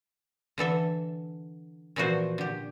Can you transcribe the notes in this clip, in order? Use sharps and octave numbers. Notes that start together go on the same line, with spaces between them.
D3 E3 A4 E5
A#2 E3 F3 A3 F#4 C5
D3 G4